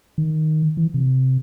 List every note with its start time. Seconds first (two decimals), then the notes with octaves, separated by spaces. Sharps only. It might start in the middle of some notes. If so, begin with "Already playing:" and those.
0.18 D#3
0.77 E3
0.94 C3